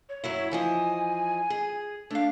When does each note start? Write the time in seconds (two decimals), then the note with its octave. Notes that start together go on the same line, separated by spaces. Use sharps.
0.09 C#5
0.24 F#2 F#3 E4
0.51 E3 F3 D#5 G#5
1.50 G#4
2.11 A3 D4 F5